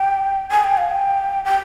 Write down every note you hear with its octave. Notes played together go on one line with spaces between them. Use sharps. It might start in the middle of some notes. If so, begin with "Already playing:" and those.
Already playing: G5
G#5
G5
F5
G5
G5